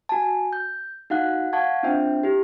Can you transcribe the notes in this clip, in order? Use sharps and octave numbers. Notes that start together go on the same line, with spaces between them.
F#4 G#5 A5
G6
D#4 F#4 F5 F#5 F#6
F5 F#5 A5 C#6 G#6
C4 D4 F4 C5 E5 G5
E4 G4